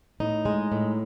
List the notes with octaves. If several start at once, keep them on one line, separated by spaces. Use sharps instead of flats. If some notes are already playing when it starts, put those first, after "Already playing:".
A2 D#4
G#3
A2